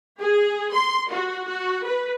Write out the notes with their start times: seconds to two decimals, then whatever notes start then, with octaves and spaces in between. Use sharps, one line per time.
0.19 G#4
0.73 C6
1.11 F#4
1.46 F#4
1.85 B4